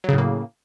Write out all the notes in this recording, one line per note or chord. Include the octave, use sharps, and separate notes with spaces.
A2 C#3 F#3 A#3